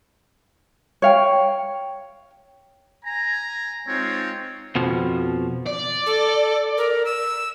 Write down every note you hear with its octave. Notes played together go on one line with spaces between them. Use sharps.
C#5 F5 G5
G#5 A#5
G#3 C4 D#4 F4 C#5
F2 B2 F3
D5
A4
A#4
E6